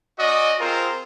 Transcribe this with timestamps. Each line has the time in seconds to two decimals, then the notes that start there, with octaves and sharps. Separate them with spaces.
0.20 C#4 F#4 D5 D#5
0.60 C4 F4 G#4 A#4 C5